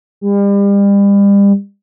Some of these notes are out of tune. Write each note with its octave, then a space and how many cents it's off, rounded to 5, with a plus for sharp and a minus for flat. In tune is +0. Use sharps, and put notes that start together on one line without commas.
G3 +35